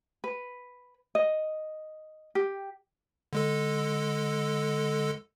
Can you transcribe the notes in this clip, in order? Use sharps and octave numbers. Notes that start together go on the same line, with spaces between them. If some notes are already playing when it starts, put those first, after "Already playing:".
B4
D#5
G4
D3 G#3 A4